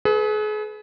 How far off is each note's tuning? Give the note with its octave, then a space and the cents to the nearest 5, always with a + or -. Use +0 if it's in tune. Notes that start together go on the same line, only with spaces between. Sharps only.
G#4 +40 B4 +0